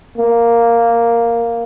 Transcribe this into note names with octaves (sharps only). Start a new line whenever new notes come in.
A#3